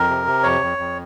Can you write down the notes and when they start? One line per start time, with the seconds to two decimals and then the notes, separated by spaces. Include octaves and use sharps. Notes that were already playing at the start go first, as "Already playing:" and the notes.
Already playing: F2 A#4
0.09 C3
0.26 C3
0.43 F2 C#5
0.61 F2
0.78 F2